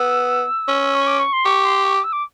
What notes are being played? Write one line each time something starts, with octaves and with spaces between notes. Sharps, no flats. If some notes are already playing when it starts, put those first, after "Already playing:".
Already playing: B3 E6
C#4
C#6
D6
C#6
C6
G4 C#6
C6
C#6
D6
E6
D6